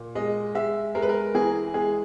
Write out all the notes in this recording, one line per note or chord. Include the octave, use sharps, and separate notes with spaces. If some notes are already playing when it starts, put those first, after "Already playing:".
Already playing: A#2
G#3 D#5
G#3 E5
G#3 A#4
B4
A#4
E3 G#4
G#3 G#4